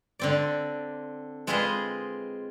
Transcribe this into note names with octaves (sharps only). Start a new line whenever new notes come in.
D3 C4 D5
G#3 C4 F4 G#4 B4 D#5